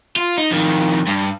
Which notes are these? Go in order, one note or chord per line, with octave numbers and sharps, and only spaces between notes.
F4
D#4
F2 D#3
G2